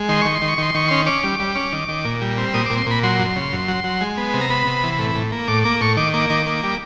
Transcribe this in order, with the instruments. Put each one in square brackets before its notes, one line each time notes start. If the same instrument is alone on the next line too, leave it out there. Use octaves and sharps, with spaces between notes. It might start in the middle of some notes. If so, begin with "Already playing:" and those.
Already playing: [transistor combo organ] G#3
D#3 C6
D#3 C#6
C6
D#3
C#6
D#3 C6
D#3 C#6
C#4 C6
C#4 D6
G3
G3
C#4
D#3
D#3
A#2
G3
C4
A#2 D#6
D6
A#2
C6
A#2 B5
F#3 C6
F#2
C#3
F#2
F#3
F#3
G#3
B3
C3
A#5
B3 B5
C3
E3
A2
A2
A#3
A2 D6
A#3 D6
A2 C#6
D#3 D6
A#3 D6
D#3 D6
A#3
G3